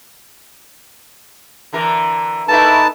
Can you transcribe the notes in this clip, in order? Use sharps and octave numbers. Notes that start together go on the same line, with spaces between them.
D3 E3 A#4
A3 A#3 D#4 E4 A4 B4 A5